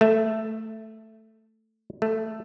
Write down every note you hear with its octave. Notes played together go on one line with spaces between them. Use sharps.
A3 E5
A3